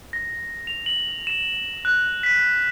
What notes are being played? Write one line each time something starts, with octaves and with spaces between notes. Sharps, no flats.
A#6
F7
F#7
E7
F#6
B6